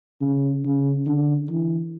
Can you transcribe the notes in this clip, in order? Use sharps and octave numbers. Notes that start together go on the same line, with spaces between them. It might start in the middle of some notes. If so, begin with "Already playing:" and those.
C#3
C#3
D3
E3